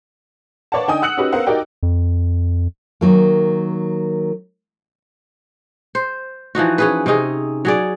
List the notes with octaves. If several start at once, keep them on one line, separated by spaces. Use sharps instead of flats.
B4 C#5 D5 F5 F#5 A5
D3 D#4 G5 G#5 D#6
F#5 E6 F#6 C#7 F#7
C#4 D#4 F#4 G4 B4
B3 A#4 C5 F5 F#5
D#4 F#4 G4 A#4 D5 G5
F2
D#3 F#3 A#3
C5
E3 F3 D#4 F#4
C#4 G#4 B4
C3 C#4 D#4 G#4
F#3 G#4 D5